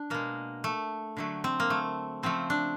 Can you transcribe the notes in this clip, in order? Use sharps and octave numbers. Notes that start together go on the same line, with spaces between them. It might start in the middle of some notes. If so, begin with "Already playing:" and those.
Already playing: D4
B2 G#3 A#3
A3
D3 F#3 A3
C4
A#3
A3
C#3 F3 A3 C4
D4